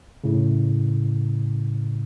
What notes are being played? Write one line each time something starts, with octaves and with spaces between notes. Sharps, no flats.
A2 C#3